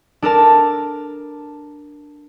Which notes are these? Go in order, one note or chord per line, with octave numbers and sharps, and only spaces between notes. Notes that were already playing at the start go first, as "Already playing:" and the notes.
D4 A4 A#4 A5